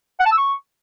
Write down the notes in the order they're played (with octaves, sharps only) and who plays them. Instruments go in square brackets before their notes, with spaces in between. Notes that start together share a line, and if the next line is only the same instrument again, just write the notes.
[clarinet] F#5
A5
E6
C#6